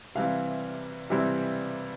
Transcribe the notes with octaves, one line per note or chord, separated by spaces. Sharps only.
C3 E3 G3 C4 E4 F5
C3 E3 G3 C4 E4